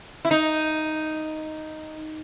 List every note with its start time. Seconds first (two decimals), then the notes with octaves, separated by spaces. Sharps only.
0.25 E4
0.31 D#4